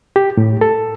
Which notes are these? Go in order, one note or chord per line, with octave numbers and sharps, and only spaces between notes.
G4
A2
A4